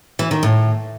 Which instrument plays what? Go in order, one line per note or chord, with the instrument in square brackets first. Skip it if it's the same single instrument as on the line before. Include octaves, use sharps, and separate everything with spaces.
[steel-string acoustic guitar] E3
D#3
A2